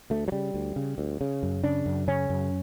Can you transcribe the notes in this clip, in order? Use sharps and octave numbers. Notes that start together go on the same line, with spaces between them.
D2 A3
F#3
C#3 G3
D2
C#3
D2
C#3
F#2
C#3 D4
F#2
C#3 C#4
F#2